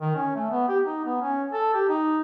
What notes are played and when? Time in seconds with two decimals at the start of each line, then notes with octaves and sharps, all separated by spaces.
0.01 D#3
0.16 C#4
0.35 A3
0.51 B3
0.68 G4
0.85 D#4
1.05 B3
1.22 C#4
1.52 A4
1.74 G4
1.89 D#4